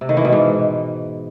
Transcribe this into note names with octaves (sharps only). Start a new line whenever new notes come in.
C3
D#3
E3
B2
G#2